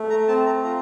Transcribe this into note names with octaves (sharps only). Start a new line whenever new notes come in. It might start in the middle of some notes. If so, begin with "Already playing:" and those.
Already playing: A3
A#5
C4 A5
A#5
F4 A#5